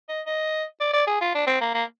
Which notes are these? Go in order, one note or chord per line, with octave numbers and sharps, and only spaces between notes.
D#5
D#5
D5
D5
G#4
F4
D4
C4
A#3
A#3